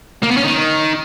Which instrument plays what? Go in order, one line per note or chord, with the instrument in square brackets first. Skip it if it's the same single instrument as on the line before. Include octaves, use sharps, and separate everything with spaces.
[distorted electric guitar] A#3
B3
C#4
D#3